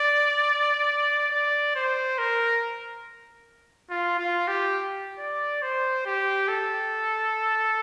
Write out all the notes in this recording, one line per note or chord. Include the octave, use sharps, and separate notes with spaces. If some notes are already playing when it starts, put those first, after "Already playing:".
Already playing: D5
D5
C5
A#4
F4
F4
G4
D5
C5
G4
A4